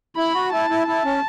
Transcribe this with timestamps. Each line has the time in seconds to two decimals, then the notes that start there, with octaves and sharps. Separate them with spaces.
0.17 E4 B5
0.34 F#4
0.52 E4 A5
0.70 E4
0.87 E4 A5
1.04 C#4